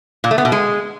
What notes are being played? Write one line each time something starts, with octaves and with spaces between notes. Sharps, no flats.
A#2
A3
B3
B2
G#3